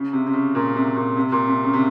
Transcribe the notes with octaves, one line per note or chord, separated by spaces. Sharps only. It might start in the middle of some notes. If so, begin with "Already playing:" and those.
Already playing: C#3
C3
C3
C#3
A#2
C3
A#2
C3
A#2
C3
C#3
C3